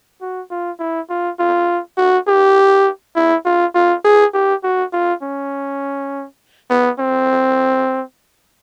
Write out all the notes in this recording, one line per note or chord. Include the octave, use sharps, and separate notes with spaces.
F#4
F4
E4
F4
F4
F#4
G4
E4
F4
F4
G#4
G4
F#4
F4
C#4
B3
C4